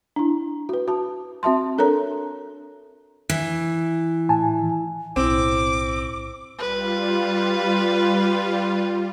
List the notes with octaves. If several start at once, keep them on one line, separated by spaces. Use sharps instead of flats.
D4 E4
F#4 B4
F#4 A5
C4 F#4 E5 A5 C6
D4 A4 A#4 C#5 A#5
E3
A2 G#5 A5
B1 A2 C4 E4 C5 D6
G3 F4 B4